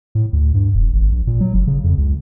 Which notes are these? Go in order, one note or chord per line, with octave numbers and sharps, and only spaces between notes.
A2
D2
G2
E1
G#1
A#1
A#2
F#3
F#1
C#3
F2
C#2